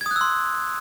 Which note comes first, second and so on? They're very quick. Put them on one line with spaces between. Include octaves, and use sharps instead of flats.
G#6 D#6 F#6 E6 C6